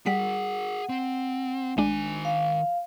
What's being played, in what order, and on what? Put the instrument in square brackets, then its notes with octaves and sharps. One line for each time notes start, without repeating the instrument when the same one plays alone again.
[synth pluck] G3 B6 [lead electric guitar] G#4 A#4 [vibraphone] F#5
[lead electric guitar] C4
[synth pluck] A1 G#3 D4 [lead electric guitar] D#3 G#5
[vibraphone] F5